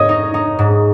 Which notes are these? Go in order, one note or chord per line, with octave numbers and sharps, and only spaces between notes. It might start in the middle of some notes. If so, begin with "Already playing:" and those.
Already playing: G#2 C#5 D#5 D#6
D#4
D#4
G#2